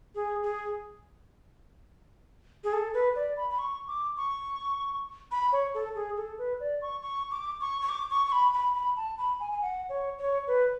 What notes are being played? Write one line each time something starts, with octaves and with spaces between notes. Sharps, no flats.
G#4
G#4
G#4
A4
B4
D5
B5
B5
C#6
D6
C#6
B5
C#5
A4
G#4
A4
B4
D5
C#6
C#6
D6
C#6
C#6
D6
C#6
C#6
B5
B5
B5
A5
B5
G#5
G#5
F#5
C#5
C#5
B4